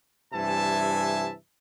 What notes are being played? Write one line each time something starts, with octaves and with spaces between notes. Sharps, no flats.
G2 C3 E3 E5 G#5 A5